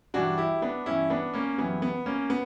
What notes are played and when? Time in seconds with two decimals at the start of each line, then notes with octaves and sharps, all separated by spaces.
0.14 G2 E3 G3 D4 F#4
0.38 E4 G4
0.62 B3 D4
0.86 G2 E3 G3 C#4 E4
1.10 B3 D4
1.34 A#3 C#4
1.57 F#2 E3 G3 B3
1.82 B3
2.06 A#3 C#4
2.30 B3